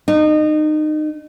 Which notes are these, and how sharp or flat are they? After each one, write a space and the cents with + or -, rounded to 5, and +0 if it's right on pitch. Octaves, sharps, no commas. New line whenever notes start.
D#4 -25